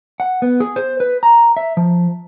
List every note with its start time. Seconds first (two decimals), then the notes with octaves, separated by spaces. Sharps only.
0.20 F#5
0.42 B3
0.60 G#4
0.76 C5
1.00 B4
1.23 A#5
1.57 E5
1.77 F3